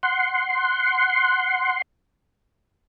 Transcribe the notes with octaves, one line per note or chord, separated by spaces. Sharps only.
F#5 C6